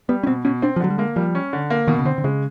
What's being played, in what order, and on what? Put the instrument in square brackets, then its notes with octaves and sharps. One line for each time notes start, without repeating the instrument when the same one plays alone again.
[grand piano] G3 [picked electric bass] B3
[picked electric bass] C#4
[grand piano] B2 [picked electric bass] C4
[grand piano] B2 [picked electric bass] C#4
[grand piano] C4 [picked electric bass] D4
[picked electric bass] F3
[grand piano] D3 [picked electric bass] F#3
[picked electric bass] G3
[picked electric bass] G#3 [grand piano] A#3
[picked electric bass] F3 [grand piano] G3
[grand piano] C#4
D3
A#3
[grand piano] B2 [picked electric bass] D#3
[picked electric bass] C#3
[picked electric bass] D3 [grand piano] C4
[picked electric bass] D3
[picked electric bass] C#3 [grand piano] G#3